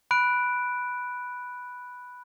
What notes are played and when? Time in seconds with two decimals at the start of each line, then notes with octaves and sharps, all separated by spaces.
0.11 B5 F#6 D7